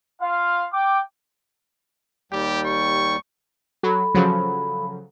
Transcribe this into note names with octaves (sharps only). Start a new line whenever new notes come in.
F4 F5
G5 D6
D#2 G3 G4 G5
C#6
F#3 A4 B5
C#3 F3 F#3